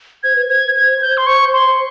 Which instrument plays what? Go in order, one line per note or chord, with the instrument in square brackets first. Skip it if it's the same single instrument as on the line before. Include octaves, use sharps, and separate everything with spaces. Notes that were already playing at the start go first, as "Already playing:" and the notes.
[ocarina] C5 [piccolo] G#6
[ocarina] B4
[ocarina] C5 [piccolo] G#6
[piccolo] G#6
G6
C6
C#6
C6